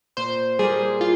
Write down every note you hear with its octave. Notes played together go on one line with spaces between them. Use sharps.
A#2 C5
G3 A#3 G#4
F4